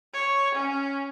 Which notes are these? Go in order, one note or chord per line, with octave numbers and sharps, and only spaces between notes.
C#5
C#4